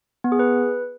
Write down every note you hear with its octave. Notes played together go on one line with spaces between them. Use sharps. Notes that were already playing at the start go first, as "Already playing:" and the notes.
B3
G#4
B4